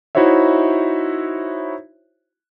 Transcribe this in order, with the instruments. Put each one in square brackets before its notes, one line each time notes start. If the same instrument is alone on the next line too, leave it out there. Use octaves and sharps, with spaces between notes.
[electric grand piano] D#4 E4 F#4 C5 C#5 E5